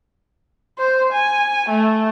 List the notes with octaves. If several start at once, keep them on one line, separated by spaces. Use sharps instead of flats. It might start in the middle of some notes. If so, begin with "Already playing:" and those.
C5
G#5
A3